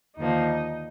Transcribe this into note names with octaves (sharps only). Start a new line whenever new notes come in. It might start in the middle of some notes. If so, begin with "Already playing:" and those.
D#2 D3 F3 A#3 D#4